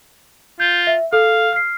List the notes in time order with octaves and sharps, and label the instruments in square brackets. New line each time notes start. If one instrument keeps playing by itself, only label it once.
[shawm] F4 [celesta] G6
[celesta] E5
[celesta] A4 [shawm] F5
[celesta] F6 C7